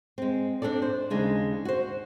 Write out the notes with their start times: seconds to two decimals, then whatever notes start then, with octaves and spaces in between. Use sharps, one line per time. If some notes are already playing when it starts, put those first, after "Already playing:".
0.18 G#3 C4
0.62 C4 D4 G4 A4 D5
0.82 C5
1.10 D#2 C#3 G#3 D4
1.65 F#4 C5